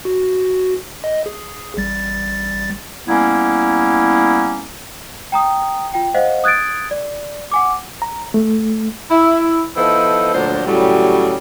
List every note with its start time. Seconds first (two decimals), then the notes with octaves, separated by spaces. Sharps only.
0.05 F#4
1.04 D#5
1.26 G#4
1.77 A1 G3 A6
3.08 G3 A#3 B3 C#4 E4
5.32 G5 A#5 D#6
5.94 F4 G5
6.14 C5 D#5 F5 F#5
6.44 D#6 F#6 G#6 A6 D7
6.91 D5
7.51 F#5 G#5 D6
8.02 A#5
8.34 A3
9.11 E4
9.76 F3 B3 D#4 E4 A4 C5
10.34 D2 A#2 F3 F#3 D4 C5
10.67 A2 C#3 F#3 G3